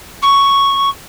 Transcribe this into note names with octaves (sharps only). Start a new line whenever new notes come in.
C#6